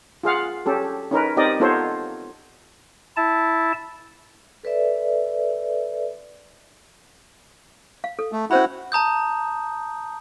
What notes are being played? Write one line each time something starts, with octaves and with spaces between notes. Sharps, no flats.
F4 G#4 F5 F#5
C#4 G4 A4
C#4 D#4 A#4 B4
C4 D#4 G4 A#4 D5 D#5
B3 D#4 F4 A4 C5 C#5
E4 A5
A4 B4 D5 E5
F5
A4
A3
C#4 E4 F#4 C5 F#5 B5
A5 A#5 D#6 G6